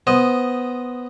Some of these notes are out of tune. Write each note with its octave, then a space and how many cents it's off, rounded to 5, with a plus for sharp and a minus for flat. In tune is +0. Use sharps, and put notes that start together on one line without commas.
B3 +0 C5 +0 D#5 +0